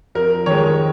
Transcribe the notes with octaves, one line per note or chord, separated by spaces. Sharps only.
F2 A#4
D#3 G#3 C#5